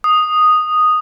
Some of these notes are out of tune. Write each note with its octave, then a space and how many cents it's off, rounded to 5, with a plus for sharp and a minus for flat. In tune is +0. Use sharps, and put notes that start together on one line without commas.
D#6 -5